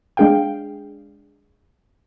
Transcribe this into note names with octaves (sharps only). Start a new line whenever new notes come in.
G#3 D4 G#4 F5 G5